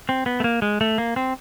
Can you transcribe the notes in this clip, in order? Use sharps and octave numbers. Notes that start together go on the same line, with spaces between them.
C4
B3
A3
A#3
G#3
A3
A#3
C4